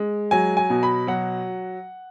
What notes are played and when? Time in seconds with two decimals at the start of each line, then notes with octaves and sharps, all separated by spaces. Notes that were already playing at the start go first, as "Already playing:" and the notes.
Already playing: G#3
0.31 F#3 G#5
0.57 G#5
0.70 B2
0.83 B5
1.07 F#3 F#5